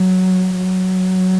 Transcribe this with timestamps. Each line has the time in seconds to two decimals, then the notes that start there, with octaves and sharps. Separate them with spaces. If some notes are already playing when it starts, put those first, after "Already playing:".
Already playing: F#3
0.56 F#3